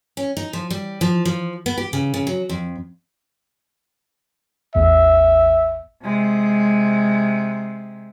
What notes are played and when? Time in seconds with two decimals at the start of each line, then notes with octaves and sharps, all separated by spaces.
0.17 C#4
0.37 D#4
0.53 F3
0.70 G3
1.01 F3
1.25 F3
1.66 B3
1.78 G4
1.93 C#3
2.14 C#3
2.27 F#3
2.49 F2
4.75 A1 E2 E5
6.03 C3 G#3